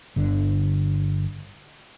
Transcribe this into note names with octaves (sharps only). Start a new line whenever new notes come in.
G1 D3